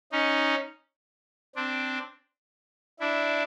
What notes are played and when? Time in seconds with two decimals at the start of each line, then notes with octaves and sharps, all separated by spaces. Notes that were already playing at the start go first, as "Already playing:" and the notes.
0.12 C#4 D#4
1.56 C4 D4
2.99 D4 E4